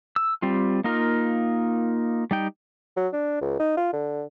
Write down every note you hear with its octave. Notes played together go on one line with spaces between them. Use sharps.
E6
G3 C4 F4
A#3 D#4 F4 A#4
G3 D#4 G5
F#3
D4
C#2
D#4
F4
D3